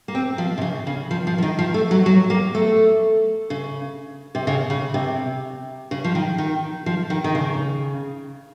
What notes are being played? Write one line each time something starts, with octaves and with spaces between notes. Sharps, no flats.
A#3
C4
F3
C3
C#3
C#3
F3
F3
F3
D#3
F3
A3
F#3
F#3
A#3
A3
C#3
C3
C#3
C#3
C3
C#3
F3
D#3
D#3
F3
D#3
D#3
C#3